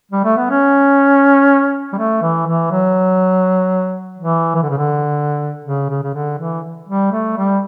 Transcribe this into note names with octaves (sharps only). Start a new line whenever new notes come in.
G3
A3
B3
C#4
G3
A3
E3
E3
F#3
E3
E3
D3
C#3
D3
C#3
C#3
C#3
D3
E3
G3
A3
G3